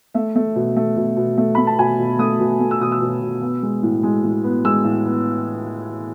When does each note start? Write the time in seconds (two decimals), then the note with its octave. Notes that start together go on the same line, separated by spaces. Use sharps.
0.14 A3 E5
0.36 A3
0.56 B2
0.76 A3
0.97 B2
1.17 B2
1.38 A3
1.55 A3 B5
1.67 A5
1.78 B2 G#5
1.99 B2
2.19 A3 D#6
2.40 B2
2.60 A3
2.71 E6
2.81 B2 D#6
2.92 E6
3.01 B2
3.22 B2
3.42 B3
3.63 G#3
3.83 A2
4.03 G#3
4.24 A2
4.44 B3
4.65 G#3 E6
4.84 A2
5.05 B3